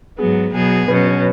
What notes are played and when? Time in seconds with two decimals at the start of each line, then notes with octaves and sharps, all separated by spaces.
0.18 G#2 F#3 B3 G#4
0.53 B2 F#3 B3 G#4
0.88 B2 F#3 C#4 B4
1.05 C#5